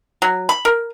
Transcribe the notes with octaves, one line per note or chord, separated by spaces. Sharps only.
F#3
B5
A#4